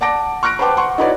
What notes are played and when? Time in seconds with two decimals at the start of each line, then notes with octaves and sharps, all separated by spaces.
0.01 D5 F#5 A5 D6 A#6 D7
0.43 C#6 F6 F#6 A#6 D7
0.59 B4 C5 F#5 G5 A5 D6
0.77 F#5 C6 C#6
0.98 D#4 E4 F#4 B4 C#5 D5